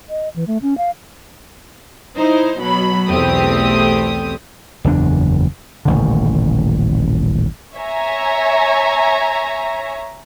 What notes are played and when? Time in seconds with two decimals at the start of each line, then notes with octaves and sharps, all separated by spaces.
0.10 D#5
0.36 E3
0.47 A3
0.62 C#4
0.78 F5
2.17 D#4 E4 C5
2.58 B2 F#3 B5
3.09 B1 E2 A3 C4 G4 D#6
4.84 F#1 E2 D4
5.85 D#1 A1 D3
7.75 C#5 E5 G#5 A#5